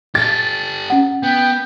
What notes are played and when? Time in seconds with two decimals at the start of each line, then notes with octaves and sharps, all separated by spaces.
0.15 G4 A4 A6
0.90 C#4 F#5
1.23 B3 G5